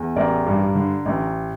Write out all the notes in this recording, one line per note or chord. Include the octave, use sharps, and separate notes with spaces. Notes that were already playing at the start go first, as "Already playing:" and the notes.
Already playing: E2
A1 A#4 D5
G2
D3
A1